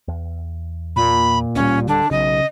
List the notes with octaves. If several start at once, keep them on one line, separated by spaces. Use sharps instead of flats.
E2
A#2 B5
D1 G3 C#4
D3 D4
B1 C#3 D#5